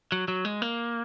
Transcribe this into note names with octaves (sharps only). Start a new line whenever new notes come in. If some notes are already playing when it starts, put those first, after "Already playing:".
F#3
F#3
G#3
A#3